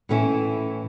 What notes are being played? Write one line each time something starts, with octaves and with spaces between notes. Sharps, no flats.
A2 E3 A3 C#4 E4